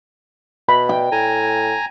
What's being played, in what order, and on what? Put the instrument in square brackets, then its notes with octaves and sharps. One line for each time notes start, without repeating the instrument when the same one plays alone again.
[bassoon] B2 [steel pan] B5
[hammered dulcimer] G5
[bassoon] A2 [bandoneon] G#5 A#5